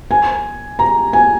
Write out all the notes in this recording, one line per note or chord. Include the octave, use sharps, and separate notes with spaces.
G#5
A#5
G#5